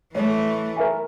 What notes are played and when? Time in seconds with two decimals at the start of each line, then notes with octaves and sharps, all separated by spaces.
0.15 E3 A3 C#5
0.76 A#4 E5 G#5